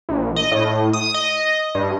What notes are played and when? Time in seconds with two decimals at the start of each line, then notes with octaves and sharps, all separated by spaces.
0.09 A#1
0.36 D#5
0.52 A2
0.93 D#6
1.14 D#5
1.75 G2